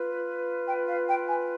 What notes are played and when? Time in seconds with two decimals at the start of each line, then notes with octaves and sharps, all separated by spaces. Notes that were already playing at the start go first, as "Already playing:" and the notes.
Already playing: F4 B4
0.66 G5
0.88 F5
1.07 G5
1.28 G#5